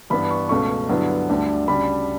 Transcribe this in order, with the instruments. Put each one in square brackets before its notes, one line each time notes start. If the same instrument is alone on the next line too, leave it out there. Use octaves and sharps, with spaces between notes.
[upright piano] G2 E3 B3 D4 B5
C#6
C#2 B2 A3 C#4 C#6
G2 D3 F#3 B3 E4
D2 D3 G3 D4
D2 C#3 G3 D4 B5